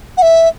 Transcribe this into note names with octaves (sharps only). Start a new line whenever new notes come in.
F#5
E5